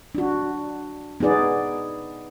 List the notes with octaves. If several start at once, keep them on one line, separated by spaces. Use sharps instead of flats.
D4 F#4
B3 D#4 G#4 D5